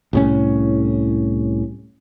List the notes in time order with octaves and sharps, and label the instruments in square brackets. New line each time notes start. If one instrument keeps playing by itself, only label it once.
[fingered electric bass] C2 A2 C#4